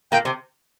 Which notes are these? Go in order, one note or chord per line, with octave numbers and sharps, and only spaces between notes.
A#2 A#3 G5
C3 C4